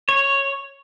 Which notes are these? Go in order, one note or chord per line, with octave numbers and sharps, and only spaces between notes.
C#5